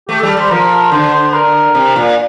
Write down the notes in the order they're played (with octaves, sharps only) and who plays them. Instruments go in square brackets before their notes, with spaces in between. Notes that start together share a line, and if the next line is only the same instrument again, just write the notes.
[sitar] A3 [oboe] G4
[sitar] G3 [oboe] A4
[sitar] G3 [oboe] C5
[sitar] F3 [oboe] A#4
[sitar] D3 [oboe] C5
[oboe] C5
A#4
[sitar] C3
A#2